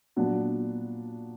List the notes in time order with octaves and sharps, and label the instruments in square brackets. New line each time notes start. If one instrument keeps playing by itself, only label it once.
[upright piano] A#2 F#3 B3 D4 F#4